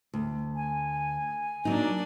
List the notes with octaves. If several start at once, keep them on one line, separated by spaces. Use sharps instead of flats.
D2
G#5
F#3 A#3 D4 D#4